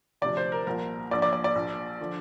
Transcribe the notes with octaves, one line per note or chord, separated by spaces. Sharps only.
D2 C3 F3 D5
C5
A#4
C2 A#2 F3 A#4
A#1 A#2 F3 D5
D5
D5
D5
A#1 A#2 F3
D3 F3